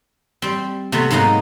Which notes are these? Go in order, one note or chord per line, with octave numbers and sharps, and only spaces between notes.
G3 C4
C3 A3 B3
G#2 F#3 A#3 B3 D#4